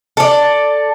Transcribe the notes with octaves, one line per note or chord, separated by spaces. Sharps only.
A4 D5